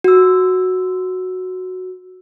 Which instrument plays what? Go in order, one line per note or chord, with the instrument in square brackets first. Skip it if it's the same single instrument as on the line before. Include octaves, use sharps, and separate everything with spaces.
[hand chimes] F#4 E6